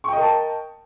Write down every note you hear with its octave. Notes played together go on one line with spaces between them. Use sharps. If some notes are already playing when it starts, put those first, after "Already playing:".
A#4 D#5 G5 A5 C#6